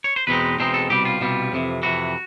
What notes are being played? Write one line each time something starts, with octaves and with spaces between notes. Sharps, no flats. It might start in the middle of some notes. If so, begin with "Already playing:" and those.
C#5
C5
E2 B2 G#3 C4 D#4 B4
E2 B2 G#3 C4 D#4 C5
A4
C2 B2 G3 G4
F4
C2 B2 G3
F2 C3 E3
F2 C3 E3 F#4